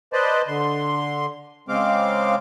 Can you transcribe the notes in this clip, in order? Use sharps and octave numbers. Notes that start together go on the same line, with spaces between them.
B4 C5 D5 D#5 A5
D3 C6
C#3 G#3 C4 F5 D6